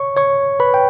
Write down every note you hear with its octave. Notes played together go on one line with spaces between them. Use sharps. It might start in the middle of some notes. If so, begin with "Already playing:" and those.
Already playing: C#5 C#6
C#5 C#6
B4 B5
G5